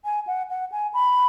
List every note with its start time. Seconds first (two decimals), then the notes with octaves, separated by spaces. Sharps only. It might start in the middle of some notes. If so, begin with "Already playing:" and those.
0.05 G#5
0.27 F#5
0.50 F#5
0.72 G#5
0.94 B5